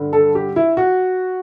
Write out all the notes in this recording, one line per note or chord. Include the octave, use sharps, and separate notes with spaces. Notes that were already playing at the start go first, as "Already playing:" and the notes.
Already playing: G2 D3
A4
G4
E4
F#4